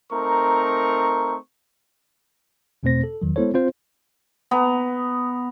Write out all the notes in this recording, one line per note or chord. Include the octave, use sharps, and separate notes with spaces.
A3 C4 D#4 A#4 A#5 C#6
E2 B2 A3 C4 C5 A#6
A4
E2 D#3 F#3
G#3 B3 E4 A4 C5 C#5
C4 F4 C5
B3 A#5